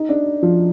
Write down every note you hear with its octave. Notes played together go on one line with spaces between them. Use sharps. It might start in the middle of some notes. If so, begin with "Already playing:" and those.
Already playing: D#4
D4
F3